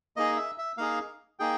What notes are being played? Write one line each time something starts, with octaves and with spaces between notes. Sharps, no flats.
A#3 D#4 G#4 D#5
E5
E5
A#3 D#4 G#4 F5
A#3 D#4 G#4 G5